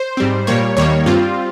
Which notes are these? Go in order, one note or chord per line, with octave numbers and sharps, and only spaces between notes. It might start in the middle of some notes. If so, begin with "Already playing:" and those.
Already playing: C5
G#2 G3 C4
A#2 G3 A#3 C#5
D#2 D#3 G3 A#3 C#5
G2 G3 C4 F4